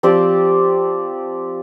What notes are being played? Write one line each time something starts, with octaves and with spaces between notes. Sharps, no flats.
F3 C4 G4 D5